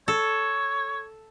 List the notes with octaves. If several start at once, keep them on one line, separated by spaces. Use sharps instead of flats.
A4 C#5